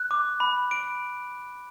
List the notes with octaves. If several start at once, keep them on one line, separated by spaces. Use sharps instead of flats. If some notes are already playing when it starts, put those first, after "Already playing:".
Already playing: F#6
D6
B5
D7